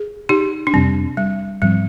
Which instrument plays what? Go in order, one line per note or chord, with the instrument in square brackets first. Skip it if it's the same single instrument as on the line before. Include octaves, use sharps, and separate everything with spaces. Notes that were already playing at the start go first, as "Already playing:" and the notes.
Already playing: [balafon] G#4
D#4 G4
D4
[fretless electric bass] F2 C3 G3 [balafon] C4
[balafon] G3
[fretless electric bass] G#2 F3 C4 [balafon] G3